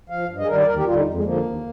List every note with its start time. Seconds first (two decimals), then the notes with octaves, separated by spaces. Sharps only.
0.09 F3 F5
0.28 G2
0.38 D#5
0.43 G#4
0.47 G3 A#4
0.51 D#3
0.57 D5
0.66 D#2 A#4
0.76 G4
0.86 G3 F4
0.90 D3
0.95 D#4
1.05 F2
1.14 G#3
1.24 D3 F3 A#3
1.43 D#2